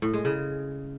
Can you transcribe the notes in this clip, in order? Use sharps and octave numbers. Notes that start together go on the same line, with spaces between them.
A2
G#3
C#3